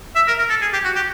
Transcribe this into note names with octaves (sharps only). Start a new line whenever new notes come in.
E5
A#4
A#4
A4
G#4
G4
F#4
G4